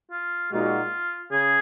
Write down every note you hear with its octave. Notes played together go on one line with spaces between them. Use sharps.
F4
A#2 G#3 D#4 F4 F#4
C#3 G#4